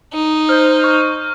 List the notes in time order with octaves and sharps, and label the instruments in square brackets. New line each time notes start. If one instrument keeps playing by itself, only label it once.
[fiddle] D#4
[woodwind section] C5 [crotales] F6 G6
[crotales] C#6 G6